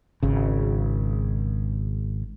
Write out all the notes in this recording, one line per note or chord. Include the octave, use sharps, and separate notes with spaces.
G#1 C#3